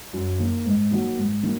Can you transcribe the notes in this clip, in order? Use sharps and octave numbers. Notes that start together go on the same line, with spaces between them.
F#2
D#3 A#3
G#2
D#3 F#3 A#3
G#2
D#3 F#3 A#3